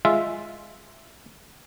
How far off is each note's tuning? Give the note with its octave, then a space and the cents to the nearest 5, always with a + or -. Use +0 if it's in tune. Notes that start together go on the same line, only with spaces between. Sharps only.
G#3 +0 F4 -5 E5 +0